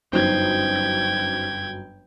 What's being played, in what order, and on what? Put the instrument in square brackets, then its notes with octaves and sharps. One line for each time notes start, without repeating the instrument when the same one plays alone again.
[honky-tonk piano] G1 F#2 [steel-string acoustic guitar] D#4 C5 [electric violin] G5 G#6